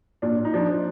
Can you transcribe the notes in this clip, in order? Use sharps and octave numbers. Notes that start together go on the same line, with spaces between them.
A#2 D4
D#4
F3 D4